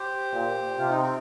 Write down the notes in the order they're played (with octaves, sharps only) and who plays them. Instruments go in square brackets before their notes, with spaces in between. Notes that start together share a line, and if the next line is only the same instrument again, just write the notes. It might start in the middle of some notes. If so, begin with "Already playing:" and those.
Already playing: [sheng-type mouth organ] G4 C5
[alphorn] A#2
[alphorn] C3 [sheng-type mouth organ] F4
[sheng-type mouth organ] D#4
C4